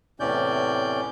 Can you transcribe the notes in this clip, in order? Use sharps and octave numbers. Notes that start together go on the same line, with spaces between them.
E2 A2 C3 C#4 D5 G6